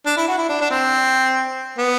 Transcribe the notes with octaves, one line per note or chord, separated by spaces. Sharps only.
D4
E4
F#4
E4
D4
D4
C4
B3